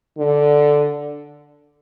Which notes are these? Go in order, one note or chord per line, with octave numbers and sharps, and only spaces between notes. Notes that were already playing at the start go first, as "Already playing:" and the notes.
D3